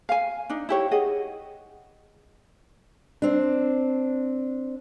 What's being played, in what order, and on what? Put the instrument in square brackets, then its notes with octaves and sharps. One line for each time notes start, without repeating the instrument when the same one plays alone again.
[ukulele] F5 G#5
D4 D#4
E4 G4 C#5
G#4 D#5 F#5
[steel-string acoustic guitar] C4 D4